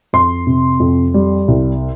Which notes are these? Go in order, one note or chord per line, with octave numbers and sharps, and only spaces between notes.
F2 C6
C3
F2
G3
C2